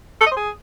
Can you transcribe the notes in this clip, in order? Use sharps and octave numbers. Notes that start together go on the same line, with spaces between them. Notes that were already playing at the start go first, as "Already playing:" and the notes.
A4
D#5
C5
G#4